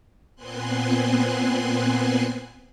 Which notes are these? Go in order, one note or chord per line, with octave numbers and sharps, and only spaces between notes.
A#2 B3 C4 G#5 C6 F#6